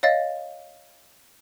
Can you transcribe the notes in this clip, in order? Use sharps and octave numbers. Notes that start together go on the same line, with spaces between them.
C#5 D#5 F5 A6